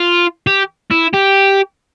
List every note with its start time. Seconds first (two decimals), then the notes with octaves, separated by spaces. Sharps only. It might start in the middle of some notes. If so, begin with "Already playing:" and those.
Already playing: F4
0.47 G4
0.91 E4
1.13 G4